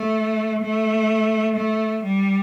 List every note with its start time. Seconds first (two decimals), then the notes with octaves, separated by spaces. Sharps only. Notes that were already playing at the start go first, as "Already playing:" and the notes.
Already playing: A3
0.62 A3
1.56 A3
2.04 G3